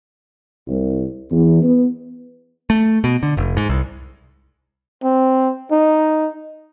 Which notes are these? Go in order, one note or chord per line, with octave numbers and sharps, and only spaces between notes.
C2
E2
B3
A3
B2
D3
F1
G#2
C2
C4
D#4